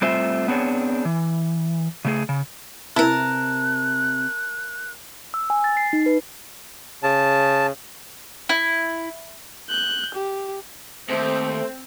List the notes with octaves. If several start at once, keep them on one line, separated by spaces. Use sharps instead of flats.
G3 A3 C4 F4 C5 E5
B3 C4 D4 G#4 C#5
E3
C#3 A3 G#4
C#3
C3 E4 A#4 A5 F#6
E6
G#5
A6
C7
D#4
B4
C#3 A5
E4
F#6 G6
G4
D#2 A3 C4 C5